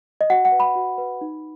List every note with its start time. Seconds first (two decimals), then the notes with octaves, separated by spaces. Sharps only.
0.21 D#5
0.30 F#4 F#5
0.45 F#5
0.52 B4
0.60 B5
0.75 F#4
0.98 B4
1.21 D#4